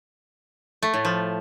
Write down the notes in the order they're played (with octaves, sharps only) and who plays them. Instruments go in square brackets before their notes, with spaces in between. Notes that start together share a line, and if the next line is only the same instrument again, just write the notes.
[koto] A3
A2
F3